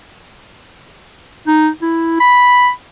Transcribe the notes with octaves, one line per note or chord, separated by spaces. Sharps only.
D#4
E4
B5